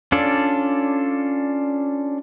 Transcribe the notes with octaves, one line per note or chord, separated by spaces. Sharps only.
C#4 D4 F4 A4 D5